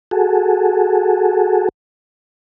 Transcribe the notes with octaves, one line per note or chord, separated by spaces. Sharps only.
F#4 G#4 A4